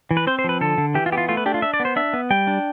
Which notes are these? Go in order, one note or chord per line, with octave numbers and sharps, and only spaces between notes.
E3
B4
C4 C5
C5
F3 B4
D3 A4
D3
E3 G4
F4
B3 G4
F4
A3 F4
B4
D4 G4
F4
D4 E5
D5
B3
C5
D4 E5
B3
G3 G5
D4